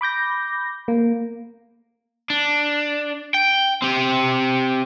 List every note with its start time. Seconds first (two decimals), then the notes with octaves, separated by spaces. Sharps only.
0.01 B5 D6 G6 A#6
0.88 A#3
2.30 D4
3.34 G5
3.82 C4 G4